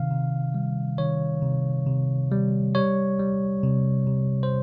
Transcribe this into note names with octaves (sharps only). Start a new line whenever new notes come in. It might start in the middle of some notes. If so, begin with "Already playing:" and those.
Already playing: C3 D#3 F5
C3
G3
D#3 C#5
C3
C3
G3
G3 C#5
G3
C3
C3
C5